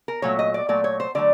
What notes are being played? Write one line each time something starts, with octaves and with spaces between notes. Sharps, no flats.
A#4
A#2 F#3 A3 C#5
D#5
D5
A#2 F#3 A3 D5
C#5
C5
D3 F#3 A3 D5